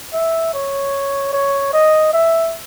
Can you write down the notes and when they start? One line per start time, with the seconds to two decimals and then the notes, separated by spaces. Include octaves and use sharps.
0.14 E5
0.54 C#5
1.33 C#5
1.73 D#5
2.13 E5